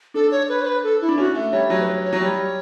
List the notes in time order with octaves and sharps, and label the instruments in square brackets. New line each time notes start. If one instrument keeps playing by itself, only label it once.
[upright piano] D4 [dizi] A4
[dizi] C#5
B4
C#5
B4
A4
E4
[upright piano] D4
[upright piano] C#4 [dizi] F#4
[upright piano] A3
[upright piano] G3 [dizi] C#5
[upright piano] F#3 [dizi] C#5
[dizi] B4
C#5
C#5
[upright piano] F#3
[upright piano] G3 [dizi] C#5